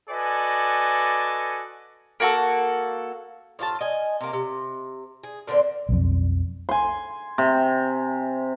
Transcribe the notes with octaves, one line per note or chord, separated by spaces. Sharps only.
F#4 A4 B4 D5 D#5 G#5
A#3 F#4 A4
A2 F4 G#4 A5
D#5 G#5
C3 A#3
C3
G#4
A#2 D3 B3 C4
B1 F2
G#5 C6
C3